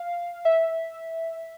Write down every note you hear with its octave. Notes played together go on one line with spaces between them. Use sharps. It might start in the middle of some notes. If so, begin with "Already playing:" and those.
Already playing: F5
E5